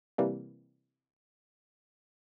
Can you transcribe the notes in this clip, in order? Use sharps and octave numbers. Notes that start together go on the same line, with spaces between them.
C3 E3 G3 A#3